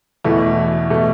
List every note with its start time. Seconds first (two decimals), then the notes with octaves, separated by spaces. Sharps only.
0.24 E2 B2 A3 E4
0.90 B2 A3